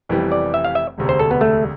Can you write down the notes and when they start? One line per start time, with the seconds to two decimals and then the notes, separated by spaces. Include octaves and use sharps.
0.09 F1 F2 E3 G3 B3
0.32 D5
0.54 E5
0.64 F5
0.75 E5
0.98 E1 D2 C3
1.09 C5
1.19 A4
1.31 B3
1.41 A3